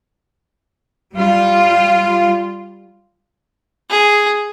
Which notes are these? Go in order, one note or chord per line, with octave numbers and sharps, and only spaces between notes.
G3 F4
G#4